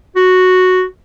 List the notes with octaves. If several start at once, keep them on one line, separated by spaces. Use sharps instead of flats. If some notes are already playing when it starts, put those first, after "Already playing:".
F#4